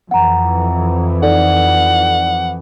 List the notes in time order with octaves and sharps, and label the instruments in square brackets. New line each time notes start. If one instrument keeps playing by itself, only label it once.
[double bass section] F2 E3 [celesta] F#5 A#5
[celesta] D#4 A4 D5 [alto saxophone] F#5